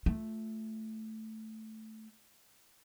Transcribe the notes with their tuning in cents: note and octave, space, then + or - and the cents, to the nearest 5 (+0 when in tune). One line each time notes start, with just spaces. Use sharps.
A3 +0 F4 +0